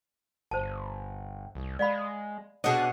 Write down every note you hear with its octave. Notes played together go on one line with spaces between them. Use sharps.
G1 C5 A5
C2
G#3 D5 F5 B5
B2 D4 G#4 C#5 D#5 F#5